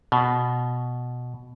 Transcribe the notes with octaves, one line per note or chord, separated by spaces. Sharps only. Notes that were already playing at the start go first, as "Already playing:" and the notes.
B2